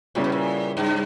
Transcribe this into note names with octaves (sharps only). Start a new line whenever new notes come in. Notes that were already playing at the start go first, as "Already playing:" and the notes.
A#2 C#3 G3 C#4 E4 G4
B2
A#2
G2